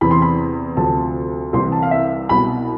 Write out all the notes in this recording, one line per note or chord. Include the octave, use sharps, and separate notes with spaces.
E2 C3 E3 B5
C6
B5
D2 C3 F3 A5
C2 C3 E3 C6
A5
F5
E5
C2 B2 B5